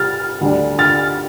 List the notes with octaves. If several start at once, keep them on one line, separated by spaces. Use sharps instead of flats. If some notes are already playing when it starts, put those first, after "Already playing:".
Already playing: C3 G3 F6 A6
D2 D3 G3 D4
F6 A6